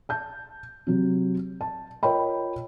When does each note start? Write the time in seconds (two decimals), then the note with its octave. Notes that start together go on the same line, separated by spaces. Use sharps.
0.09 A5 G6
0.87 C3 F#3
1.61 A5
2.03 F4 A#4 C#5 D#5 G5 B5